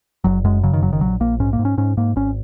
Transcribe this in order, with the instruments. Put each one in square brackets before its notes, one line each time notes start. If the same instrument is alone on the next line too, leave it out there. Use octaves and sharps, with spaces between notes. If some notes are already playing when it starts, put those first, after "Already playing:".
[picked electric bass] F#1 F#3
F#2 G#3
C#3 F#3
D#3
F#1 F#3
D#3
A#1 F#3
A#1 A#3
G#2 C#4
A#3
G#2
C#4
G#2 C#4
G#2 A#3
G#1 C#4